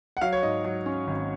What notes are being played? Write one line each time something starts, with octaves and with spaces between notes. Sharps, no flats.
F#5
F#3 F5
C#5
G#2 D#5
F#3
C#4
G#1